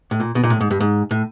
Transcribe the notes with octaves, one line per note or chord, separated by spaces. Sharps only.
A2
A#2
B2
A#2
A2
G#2
G2
G#2
A2